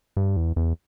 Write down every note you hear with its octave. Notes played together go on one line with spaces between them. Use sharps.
G2
E2
E2